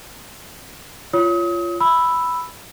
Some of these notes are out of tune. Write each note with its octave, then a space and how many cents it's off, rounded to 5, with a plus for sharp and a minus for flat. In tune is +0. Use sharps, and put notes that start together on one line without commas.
F4 -15 C#5 +15 D#6 +35
B5 +0 E6 +0